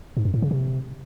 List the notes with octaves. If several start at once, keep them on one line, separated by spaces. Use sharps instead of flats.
G#2
F#2
A2
C#3
C3